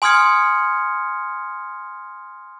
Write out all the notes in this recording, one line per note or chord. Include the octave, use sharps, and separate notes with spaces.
G#5 C6 D#6 F6 G#6 C#7